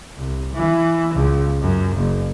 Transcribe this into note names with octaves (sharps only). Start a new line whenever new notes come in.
C2
E3
C#2
F#2
F#1